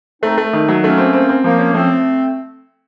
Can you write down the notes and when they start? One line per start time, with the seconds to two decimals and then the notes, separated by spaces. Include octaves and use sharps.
0.23 A3 C4 D#4
0.38 A3
0.53 D#3
0.69 F#3
0.83 A3 A#3 C#4
0.98 C4
1.13 C4
1.29 C4
1.44 F3 A#3
1.58 C#4
1.74 F3 A3 C4